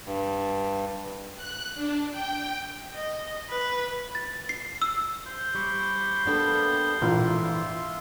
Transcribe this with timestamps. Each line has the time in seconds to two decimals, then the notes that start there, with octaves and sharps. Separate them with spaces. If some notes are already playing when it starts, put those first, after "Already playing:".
0.06 G2
1.37 F#6
1.75 D4
2.11 G5
2.95 D#5
3.50 B4
4.15 A6
4.49 C7
4.82 E6
5.27 C5
5.55 G3 B5 C#6 D6
6.26 G3 A#3 B3 D4 A4
7.01 A#1 G#2 E3 F4 E5 C6